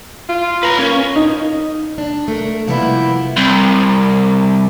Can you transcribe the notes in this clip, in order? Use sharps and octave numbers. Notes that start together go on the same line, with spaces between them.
F4
B4 A#5
A#3 C#4
D#4
D4
A3 A#4
C3 F3 G3 A#3 B3 E4
C2